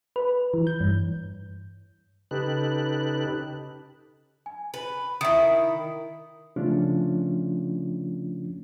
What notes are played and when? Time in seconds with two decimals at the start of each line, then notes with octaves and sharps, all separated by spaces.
0.16 B4
0.54 E3
0.67 G6
0.80 G2
2.31 C#3 D#4 G4 A4 B4 F#6
4.46 G#5
4.74 B4
5.21 D#3 E4 E5 D#6
6.56 C#3 F3 A3 C#4 D4 F4